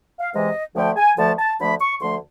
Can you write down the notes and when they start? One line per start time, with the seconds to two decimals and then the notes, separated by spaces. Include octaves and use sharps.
0.19 F5
0.33 E2 C3 E3 G#3 D#5
0.74 D2 D3 F3 A3 G5
0.96 G#5
1.16 D2 D3 F3 A3 A5
1.37 A5
1.58 D2 D3 F3 A3 B5
1.79 C#6
2.00 D2 D3 F3 A3 C6